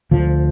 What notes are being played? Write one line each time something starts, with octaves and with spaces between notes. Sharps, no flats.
D2 F3